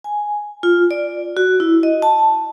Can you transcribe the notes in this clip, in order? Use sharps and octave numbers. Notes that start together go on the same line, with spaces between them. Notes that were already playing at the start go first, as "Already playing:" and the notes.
G#5
F4
D5
F#4
E4
D#5
A5